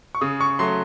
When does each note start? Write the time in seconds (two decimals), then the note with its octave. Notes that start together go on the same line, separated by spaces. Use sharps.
0.15 C#6
0.21 C#3 D#6
0.41 C#6
0.59 F#3 A3 C6